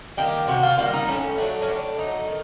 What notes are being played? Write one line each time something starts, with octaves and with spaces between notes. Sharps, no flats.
D#3 G3 A#3 G4
C3 F#4
F4
D#3 G3 A#3 F4
D#4
A2 C#4
F#3 A3 D4
C#4
A2 D4
F#3 A3 D#4
D#3